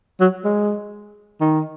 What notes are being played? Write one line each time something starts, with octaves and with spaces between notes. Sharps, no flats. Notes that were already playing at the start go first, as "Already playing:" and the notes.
F#3
G#3
D#3